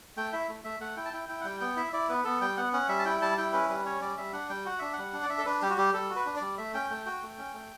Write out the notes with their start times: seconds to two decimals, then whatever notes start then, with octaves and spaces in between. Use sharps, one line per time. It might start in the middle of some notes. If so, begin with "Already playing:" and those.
0.17 A3 G5
0.33 E4 E5
0.49 A3
0.64 A3 E5
0.80 A3 F#5
0.97 E4 G5
1.05 A5
1.13 E4 G5
1.29 E4 G5
1.41 F#5
1.44 G3 G5
1.60 B3 G5
1.76 E4 E5
1.93 E4 D5
2.09 B3 B4
2.24 B3 A4
2.41 G3 G5
2.57 B3 F#5
2.73 C#4 F#5
2.89 G3 E5
2.99 A5
3.05 E4 G5
3.22 G3 A5
3.38 E4 G5
3.53 C#4 B4
3.69 G3 B4
3.85 C#4 C#5
4.02 G3 D5
4.17 G3 E5
4.33 D4 F#5
4.49 G3 G5
4.66 F#4 F#5
4.79 D4 E5
4.93 F#5
4.98 G3
5.13 D4
5.23 D5
5.29 D4 E5
5.38 A4
5.46 D4 B4
5.62 G3 G4
5.70 F#4
5.78 G3 G4
5.94 G3 A4
6.10 F#4
6.16 B4
6.26 D4
6.36 D5
6.41 G3
6.58 A3 E5
6.74 C#4 G5
6.90 A3 G5
7.06 F#4 G5
7.22 A3
7.38 C#4
7.54 A3